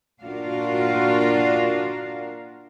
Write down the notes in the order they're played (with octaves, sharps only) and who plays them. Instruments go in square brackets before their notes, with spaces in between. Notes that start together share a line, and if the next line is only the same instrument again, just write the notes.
[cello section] A#2 D4 F4 F#4 A#4 F5